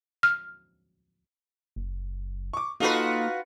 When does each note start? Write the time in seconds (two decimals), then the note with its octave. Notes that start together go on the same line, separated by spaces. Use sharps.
0.23 F6
1.76 F#1
2.53 C#6 D6
2.80 A#3 D#4 F4 F#4 A4 B4 D#5